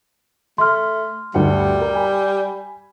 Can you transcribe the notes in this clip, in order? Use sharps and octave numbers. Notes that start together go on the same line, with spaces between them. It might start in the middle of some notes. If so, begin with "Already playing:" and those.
A3 C6 F6
D2 G2 G3 F#5
G4 A#4
G#5 B5